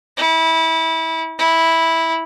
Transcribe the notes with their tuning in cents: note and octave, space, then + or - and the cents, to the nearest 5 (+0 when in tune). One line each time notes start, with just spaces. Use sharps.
E4 -25
E4 -10